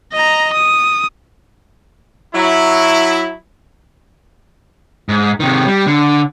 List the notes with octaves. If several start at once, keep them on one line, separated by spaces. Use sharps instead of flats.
D#5 A#5
D#6
F#3 E4
G#2
C3 D#3
G3
D3